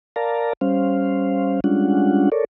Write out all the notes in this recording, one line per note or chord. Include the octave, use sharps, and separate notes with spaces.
A#4 D5 F5 A5 A#5
G3 C#4 C5 F5
G3 G#3 C#4 D4 F4 F#5
A4 A#4 C#5 D5